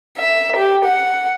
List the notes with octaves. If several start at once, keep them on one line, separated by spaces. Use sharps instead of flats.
E5
G4
F#5